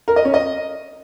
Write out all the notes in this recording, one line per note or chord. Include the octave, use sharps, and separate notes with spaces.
A#4
D#5
C#4
D#5